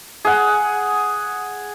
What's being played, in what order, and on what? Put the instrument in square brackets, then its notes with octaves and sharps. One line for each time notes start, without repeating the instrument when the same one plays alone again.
[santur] G#4 F#5